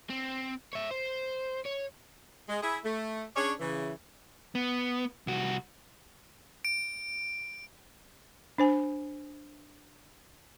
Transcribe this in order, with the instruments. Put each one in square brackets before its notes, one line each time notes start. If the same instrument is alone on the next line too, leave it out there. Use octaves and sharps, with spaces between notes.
[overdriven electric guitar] C4
C#5 E5
C5
C#5
[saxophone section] G#3
E4 G#4
A3
C#4 D4 G#4 C#5 D5
C#3 E3
[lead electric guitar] B3
C2 F#4
[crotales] D7
[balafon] D4 C5 G#5